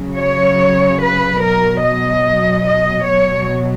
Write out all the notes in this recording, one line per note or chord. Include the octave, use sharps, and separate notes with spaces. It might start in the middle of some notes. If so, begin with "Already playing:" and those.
Already playing: C#3 F#3
C#5
B4
B2 F#3 A#4
D#5
D#5
B2 F#3 C#5